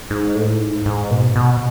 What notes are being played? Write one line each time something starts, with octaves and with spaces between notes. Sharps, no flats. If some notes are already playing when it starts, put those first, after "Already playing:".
G#2
A2
G#2
G#2
B2
B2